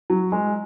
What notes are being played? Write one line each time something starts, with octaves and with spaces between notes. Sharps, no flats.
F#3
G#3